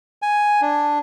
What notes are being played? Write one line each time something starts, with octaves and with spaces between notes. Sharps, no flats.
G#5
D4